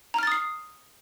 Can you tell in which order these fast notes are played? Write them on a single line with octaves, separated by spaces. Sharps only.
A#5 F6 A6 D#6 C7